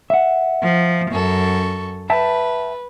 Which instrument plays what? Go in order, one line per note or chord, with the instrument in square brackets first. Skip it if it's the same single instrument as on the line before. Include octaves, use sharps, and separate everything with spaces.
[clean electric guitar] E5 F#5
[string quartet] F3
F#2 A4 C#6
[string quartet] B4 [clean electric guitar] E5 G5 A5